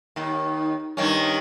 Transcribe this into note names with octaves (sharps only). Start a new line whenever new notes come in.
D#2 D#3
G2 D#3 C#4